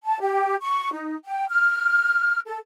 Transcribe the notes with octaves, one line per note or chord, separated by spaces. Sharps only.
A5
G4
C#6
D#4
G5
F6
A4